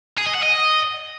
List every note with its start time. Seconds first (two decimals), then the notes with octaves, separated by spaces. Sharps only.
0.18 G#4
0.26 D#5
0.34 F#5
0.43 D#5